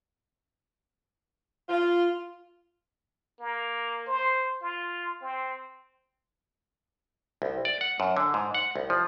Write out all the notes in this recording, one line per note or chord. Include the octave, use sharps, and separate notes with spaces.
F4
A#3
C5
F4
C4
C2
D5
F#5
F#2
D3
G#2
F#5
C2
F3